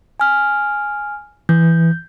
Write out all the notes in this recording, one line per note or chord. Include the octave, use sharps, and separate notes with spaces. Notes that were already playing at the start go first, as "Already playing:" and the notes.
G#5 F6
E3 G6